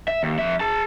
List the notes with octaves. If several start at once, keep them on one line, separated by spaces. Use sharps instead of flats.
E5
D#2
F2 E5
G#4 A5